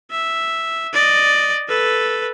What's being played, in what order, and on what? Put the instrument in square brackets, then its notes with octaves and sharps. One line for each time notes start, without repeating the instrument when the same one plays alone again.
[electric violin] E5
D5 D#5
A4 B4